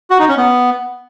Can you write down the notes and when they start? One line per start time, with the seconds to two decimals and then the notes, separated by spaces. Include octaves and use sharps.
0.10 F#4
0.19 D#4
0.28 C#4
0.37 B3